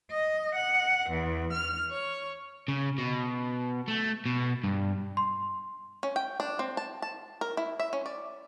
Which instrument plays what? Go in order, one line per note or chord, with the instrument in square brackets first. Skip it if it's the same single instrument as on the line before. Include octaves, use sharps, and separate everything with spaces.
[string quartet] D#5
F#5
E2
F6
C#5
[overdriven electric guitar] C#3
B2
A3
B2
G2
[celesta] C6
[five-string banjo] C#4
G5
D4
C4
A5
A5
A#4
E4
E5
C#4
D5